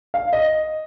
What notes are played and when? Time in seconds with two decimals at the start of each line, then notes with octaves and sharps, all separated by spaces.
0.14 F5
0.33 D#5